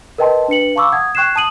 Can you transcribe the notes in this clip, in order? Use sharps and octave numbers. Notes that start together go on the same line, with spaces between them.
A#4 B4 D#5 G5 A5 C6
D4 B4 C#7 F#7
F5 A5 B5 C#6 D6 E6
F#5 D#6 G#6
G5 C#6 F#6 G#6 C7 E7
A5 D#6 D#7 F#7